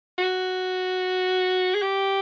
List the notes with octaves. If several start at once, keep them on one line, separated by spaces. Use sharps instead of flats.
F#4
G#4
G4